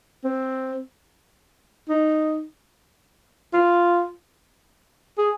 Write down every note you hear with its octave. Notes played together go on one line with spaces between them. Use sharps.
C4
D#4
F4
G#4